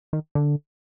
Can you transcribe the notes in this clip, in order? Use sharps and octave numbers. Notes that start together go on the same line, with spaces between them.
D#3
D3